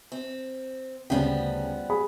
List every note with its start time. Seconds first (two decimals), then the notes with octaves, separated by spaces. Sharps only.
0.12 C4
1.10 D2 C#3 F3 G3 B3 G5
1.90 G#4 B5